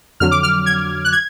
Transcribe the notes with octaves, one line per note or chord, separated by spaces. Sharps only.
F2 D3 F#3 F6
D6
F6
G#6
F#6
G#6